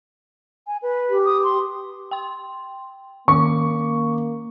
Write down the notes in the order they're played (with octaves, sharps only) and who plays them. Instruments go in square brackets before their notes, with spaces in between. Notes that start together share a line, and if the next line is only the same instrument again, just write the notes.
[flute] G#5
B4
[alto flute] G4
[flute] D#6
C6
[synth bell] G5 C6
[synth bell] D#3 C#4 D6 [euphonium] A#3 [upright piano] C#6